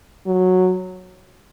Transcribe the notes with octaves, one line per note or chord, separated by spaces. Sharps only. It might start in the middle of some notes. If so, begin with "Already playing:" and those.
F#3